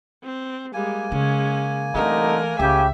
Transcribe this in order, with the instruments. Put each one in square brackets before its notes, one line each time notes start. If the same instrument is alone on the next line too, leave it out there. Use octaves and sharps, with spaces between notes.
[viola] C4
[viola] G3 G#3 [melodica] A#3 G#5
[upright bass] C#3 [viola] G#3 C#4
[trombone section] C2 D3 D#4 [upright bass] E3 [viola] A3 A#4
[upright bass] C#2 [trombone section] C#3 G4 [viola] E5